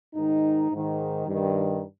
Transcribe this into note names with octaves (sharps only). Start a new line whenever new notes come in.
G#2 D#3 D#4
G#2 D#3
G2 D#3